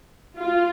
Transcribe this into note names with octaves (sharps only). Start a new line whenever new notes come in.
F4